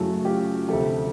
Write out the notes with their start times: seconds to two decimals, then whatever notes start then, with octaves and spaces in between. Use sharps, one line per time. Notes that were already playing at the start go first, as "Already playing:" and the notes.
Already playing: F#2 C#3 F#3 A3 E4 F#4
0.25 F4 G4
0.68 D2 C3 F3 G4 A4